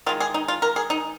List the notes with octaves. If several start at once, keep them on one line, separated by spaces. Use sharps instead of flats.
D#3 G#3 F4
G#4
D#4
F4
A#4
G#4
D#4